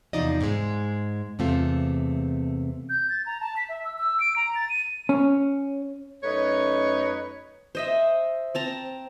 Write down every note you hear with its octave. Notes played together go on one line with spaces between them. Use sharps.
E2 C3 F3 D#4 D5 D#5
G#2 G#3
E2 C3 A3 C4 F4
G6
A6
A#5
A5
B6
E5
E6
E6
D7
A#5
A6
D#7
C#4
F#2 A3 D#4 B4 C#5
C5 D#5 E5
C4 A5 A#5